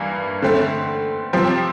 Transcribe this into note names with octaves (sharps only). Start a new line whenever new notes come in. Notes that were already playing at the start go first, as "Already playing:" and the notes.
Already playing: G2 E3 A#3
D3 A3 C4
C3 F3 C4 G4